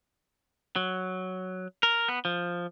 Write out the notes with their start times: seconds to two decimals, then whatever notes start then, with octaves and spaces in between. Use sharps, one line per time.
0.76 F#3
1.83 A#4
2.08 B3
2.25 F3